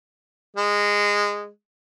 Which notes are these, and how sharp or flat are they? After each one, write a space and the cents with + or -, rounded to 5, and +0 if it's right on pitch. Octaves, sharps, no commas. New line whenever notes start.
G#3 -15